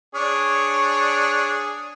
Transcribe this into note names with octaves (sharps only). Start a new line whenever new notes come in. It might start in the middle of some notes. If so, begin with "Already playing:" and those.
D4 G#4 C#5